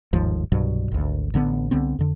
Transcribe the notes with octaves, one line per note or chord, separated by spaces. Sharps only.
G1 D#2 G#2 F3
C2 G2 B2 F#3
G#1 D2
A1 D3 A#3 B3
C2 D3 B3 C4
F2 D3